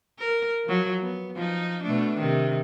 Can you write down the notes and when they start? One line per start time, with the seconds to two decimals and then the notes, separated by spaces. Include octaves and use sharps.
0.19 A#4
0.65 F3 F#3
1.03 B3
1.36 F3 D#4
1.84 B2 A3 D4
2.18 C3 D#3